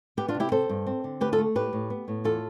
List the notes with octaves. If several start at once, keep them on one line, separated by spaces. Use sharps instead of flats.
B3 G4 B4
D4 F4
C3
E4 G4
C4 A4 C5
G2
C4
D3
D2 G4 B4
F4 A4
A3
A2 G4 B4
A2
B3
A2
E2 F4 A4